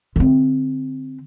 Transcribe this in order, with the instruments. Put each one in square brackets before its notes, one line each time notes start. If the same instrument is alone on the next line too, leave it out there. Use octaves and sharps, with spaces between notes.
[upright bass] D3 C4